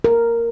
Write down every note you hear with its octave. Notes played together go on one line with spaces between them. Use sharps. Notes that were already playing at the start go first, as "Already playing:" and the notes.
A#4